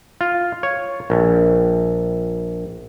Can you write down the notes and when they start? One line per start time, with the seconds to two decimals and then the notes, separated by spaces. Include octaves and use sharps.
0.21 F4
0.63 C#5
1.10 A#1